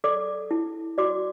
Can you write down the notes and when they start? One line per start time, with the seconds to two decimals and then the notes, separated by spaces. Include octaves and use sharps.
0.04 A4 D5 D6
0.51 E4
0.98 F#4 D5 D6